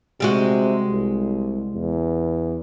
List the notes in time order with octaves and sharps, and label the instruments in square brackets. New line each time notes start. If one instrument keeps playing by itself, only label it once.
[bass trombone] C3 [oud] G3 G#3 F#4
[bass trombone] C2
E2